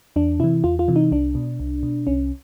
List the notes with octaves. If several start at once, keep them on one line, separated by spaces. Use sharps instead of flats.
E2 D4
C3 E3 E4
E2 F4
F4
C3 E3
D#4
C2 D4
B2
C2
B2
C2 C#4